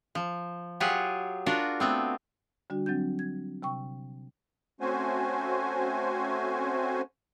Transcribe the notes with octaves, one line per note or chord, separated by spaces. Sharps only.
F3
F#3 F4 G4 G#4 F#5 G#5
D4 F4 F#4 A#4
A3 B3 C4
D3 G3 D4 F#4
F#3 C4 D4 G6
G#6
C3 G5 C#6
A3 C4 C#4 F#4 C5 G#5